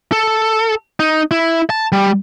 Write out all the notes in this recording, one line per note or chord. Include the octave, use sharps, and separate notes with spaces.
A4
D#4
E4
A5
G3